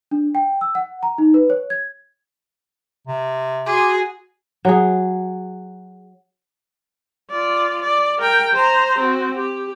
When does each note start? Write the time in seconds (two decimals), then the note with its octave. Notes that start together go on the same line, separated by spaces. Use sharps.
0.11 D4
0.35 G5
0.61 E6
0.75 F#5
1.03 A#5
1.18 D#4
1.34 B4
1.50 C#5
1.70 G#6
3.07 C3
3.66 F#4 G#4 C6 D6
4.65 F#3 G#4
7.30 F4 D5
7.82 D5
8.19 A#4 G5
8.53 C5 A#5
8.98 C4 F#4
9.37 G4